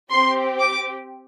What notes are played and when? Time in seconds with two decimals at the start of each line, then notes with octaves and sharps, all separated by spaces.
0.11 C4 G4 C6
0.60 D6